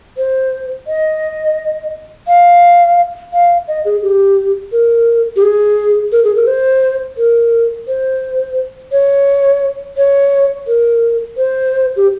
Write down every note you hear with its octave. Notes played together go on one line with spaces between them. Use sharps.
C5
D#5
F5
F5
D#5
G#4
G4
A#4
G4
G#4
A#4
G#4
A#4
C5
A#4
C5
C#5
C#5
A#4
C5
G4